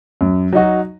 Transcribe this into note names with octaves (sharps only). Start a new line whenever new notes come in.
F#2
F#3 D#4 F#4